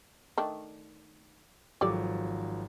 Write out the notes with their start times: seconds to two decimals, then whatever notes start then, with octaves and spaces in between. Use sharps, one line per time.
0.38 D#3 A3 D4
1.81 G#1 F3 F#3 G4 A4 D5